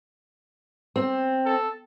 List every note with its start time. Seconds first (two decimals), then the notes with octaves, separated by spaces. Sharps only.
0.96 C4
1.45 A4